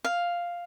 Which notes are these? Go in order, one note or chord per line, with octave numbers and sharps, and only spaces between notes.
F5